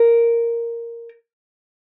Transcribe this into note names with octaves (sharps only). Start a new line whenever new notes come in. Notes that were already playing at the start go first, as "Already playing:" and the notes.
Already playing: A#4